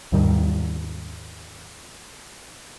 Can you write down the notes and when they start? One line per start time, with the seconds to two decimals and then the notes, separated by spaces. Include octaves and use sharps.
0.12 D#2 G#2 D#3 G3